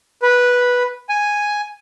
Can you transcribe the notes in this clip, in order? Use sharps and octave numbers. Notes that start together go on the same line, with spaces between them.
B4
G#5